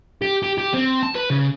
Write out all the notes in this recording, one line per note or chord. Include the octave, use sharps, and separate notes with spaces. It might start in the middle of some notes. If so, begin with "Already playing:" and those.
G4
G4
G4
C4
A5
B4
C#3